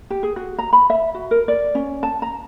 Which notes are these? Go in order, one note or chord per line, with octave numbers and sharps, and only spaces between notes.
G4
G#4
F#4
A#5
B5
E5
F#4
A#4
D5
C#4
A5
A#5